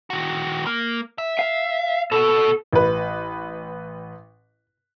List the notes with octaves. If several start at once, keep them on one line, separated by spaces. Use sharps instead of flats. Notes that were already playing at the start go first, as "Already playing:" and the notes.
D#3 F#4
A#3
E5
F5
B2 F#4 A4
A1 B4